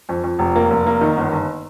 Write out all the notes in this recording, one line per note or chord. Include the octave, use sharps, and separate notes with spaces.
F2
F2
F1
A#3
F1
A#3
D#3
G1
G1